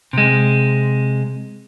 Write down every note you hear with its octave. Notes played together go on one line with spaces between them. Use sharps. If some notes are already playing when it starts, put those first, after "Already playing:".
C3 G#3